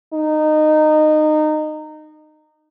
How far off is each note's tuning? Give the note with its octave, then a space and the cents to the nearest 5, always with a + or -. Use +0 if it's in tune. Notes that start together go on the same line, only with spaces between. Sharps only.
D#4 -20